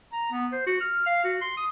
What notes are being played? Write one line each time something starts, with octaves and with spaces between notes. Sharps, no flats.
A#5
B3
C5
F#4
F6
F5
F#4
C6
D#6